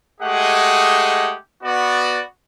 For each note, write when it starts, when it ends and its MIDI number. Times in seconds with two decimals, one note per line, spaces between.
0.21 1.34 56
0.21 1.34 57
0.21 1.34 67
0.21 1.34 68
0.21 1.34 75
0.21 1.34 78
1.63 2.21 59
1.63 2.21 66
1.63 2.21 74